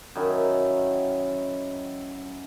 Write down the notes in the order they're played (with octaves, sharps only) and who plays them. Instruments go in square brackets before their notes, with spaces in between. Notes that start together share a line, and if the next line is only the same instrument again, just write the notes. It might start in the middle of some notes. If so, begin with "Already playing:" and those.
[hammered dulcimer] F#2 D#3 E4